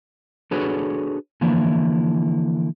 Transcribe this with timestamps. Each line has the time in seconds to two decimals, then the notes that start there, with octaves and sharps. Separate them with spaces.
0.51 D4 F#4 G#4 A4 B4 C#5
1.41 D3 E3 F3 A#3 E4